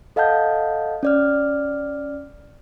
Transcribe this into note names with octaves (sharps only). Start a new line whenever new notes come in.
A4 D#5 F5 F#5 A5 G6
C#4 D5 F6